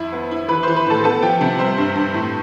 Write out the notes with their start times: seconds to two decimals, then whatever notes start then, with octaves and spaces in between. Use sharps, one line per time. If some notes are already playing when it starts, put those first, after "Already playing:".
Already playing: F2 E4
0.12 B3
0.31 E4
0.49 E3 B4 B5
0.63 E3 C5 C6
0.76 B4 B5
0.87 A2 A4 A5
1.04 B3 A4 A5
1.22 F3 G4 G5
1.41 C3
1.59 G3 C5
1.78 G2
1.96 G2
2.14 A2